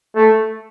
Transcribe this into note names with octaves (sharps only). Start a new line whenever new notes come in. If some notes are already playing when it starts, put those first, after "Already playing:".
A3